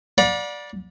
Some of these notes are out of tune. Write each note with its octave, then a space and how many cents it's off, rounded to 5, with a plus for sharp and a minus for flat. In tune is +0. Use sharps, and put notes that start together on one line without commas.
D5 +0 F#5 -45 B5 -40